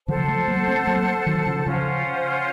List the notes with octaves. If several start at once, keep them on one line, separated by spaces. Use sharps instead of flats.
C#3 F3 A4 C5 F#5 A5
F3 A3
F#3 A#3
A3 C4
F#3 A#3
D#3 F#3
C#3 F3
C#3 F3 C#4 F4 C5 F#5